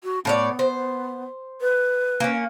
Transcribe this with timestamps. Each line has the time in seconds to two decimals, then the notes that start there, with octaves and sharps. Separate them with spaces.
0.04 F#4
0.25 A2 B3 C#5 D5
0.59 C5
1.61 B4
2.20 A#3 C#4